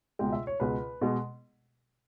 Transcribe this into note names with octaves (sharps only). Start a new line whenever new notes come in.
C#2 B2 G#3 G5
E5
C#5
C#2 B2 G#3 B4
B2 G#3